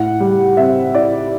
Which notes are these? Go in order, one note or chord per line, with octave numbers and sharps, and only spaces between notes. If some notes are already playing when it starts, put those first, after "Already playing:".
Already playing: A2 F#5
G3
C4 E5
E4 D5